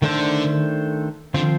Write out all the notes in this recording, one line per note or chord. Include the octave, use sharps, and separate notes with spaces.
D3 D#3 A3 D4 A4 C5
D3 F3 C4 F4 C5